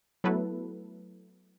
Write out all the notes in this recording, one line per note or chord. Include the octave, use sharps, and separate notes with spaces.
F#3 A3 B3 E4 A4 B4